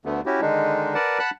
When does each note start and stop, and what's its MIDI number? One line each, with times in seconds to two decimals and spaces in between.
0.05 0.21 38
0.05 0.21 50
0.05 0.21 57
0.05 0.21 59
0.26 0.41 61
0.26 0.41 64
0.26 0.41 66
0.26 0.41 67
0.41 0.94 50
0.41 0.94 51
0.41 0.94 56
0.41 0.94 62
0.41 0.94 63
0.95 1.19 70
0.95 1.19 71
0.95 1.19 74
0.95 1.19 78
0.95 1.19 81
1.19 1.30 78
1.19 1.30 81
1.19 1.30 83
1.19 1.30 90